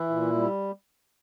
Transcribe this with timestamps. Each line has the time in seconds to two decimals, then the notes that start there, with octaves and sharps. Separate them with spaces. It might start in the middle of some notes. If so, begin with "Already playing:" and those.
Already playing: E3 E4
0.09 A#2
0.35 G3